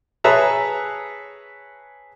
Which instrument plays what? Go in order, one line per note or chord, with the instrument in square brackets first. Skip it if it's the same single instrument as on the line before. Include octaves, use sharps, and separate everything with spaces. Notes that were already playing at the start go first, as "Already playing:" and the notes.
[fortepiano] G#4 B4 C#5 E5 A5 A#5